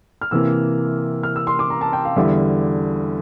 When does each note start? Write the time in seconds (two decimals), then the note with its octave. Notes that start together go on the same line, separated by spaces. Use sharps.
0.21 F6
0.31 C3 E3 A#3 E6
1.23 F6
1.36 E6
1.47 C6
1.59 D6
1.70 A#5
1.81 A5
1.93 G5
2.05 F5
2.16 E2 D3 G3 E5